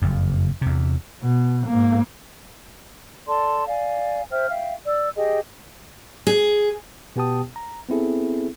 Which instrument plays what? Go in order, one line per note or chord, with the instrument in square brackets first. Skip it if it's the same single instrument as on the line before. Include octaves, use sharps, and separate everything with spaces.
[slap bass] F#1 F2
E2 C3
[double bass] B2
G#2 A#3
[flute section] A4 D5 A5 C6
D5 F5 G#5
C5 E5 G5 F6
E5 F5 G5
D5 E6
G4 G#4 D#5 G5
[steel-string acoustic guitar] G#4
[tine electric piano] B2 B3 G4 G5 A5 D#6
A#5
B3 C4 E4 G#4 A4